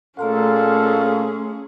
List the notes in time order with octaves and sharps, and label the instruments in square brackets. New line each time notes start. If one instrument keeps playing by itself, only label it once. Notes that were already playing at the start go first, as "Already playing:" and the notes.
[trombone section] A#2 A4 [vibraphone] A3 A#5 C6 [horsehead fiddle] C#4 G#4 [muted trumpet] F5